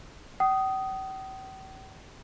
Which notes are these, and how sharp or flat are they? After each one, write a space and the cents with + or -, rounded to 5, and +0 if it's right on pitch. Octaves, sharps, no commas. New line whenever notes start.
G5 -45 D#6 +0